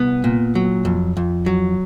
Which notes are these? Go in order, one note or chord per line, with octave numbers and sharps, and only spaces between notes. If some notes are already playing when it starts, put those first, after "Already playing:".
Already playing: C2 B3
A#2
F#3
F2
F2
F#3